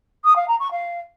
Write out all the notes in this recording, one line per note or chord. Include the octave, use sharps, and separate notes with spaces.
D#6
F5
A#5
C#6
F5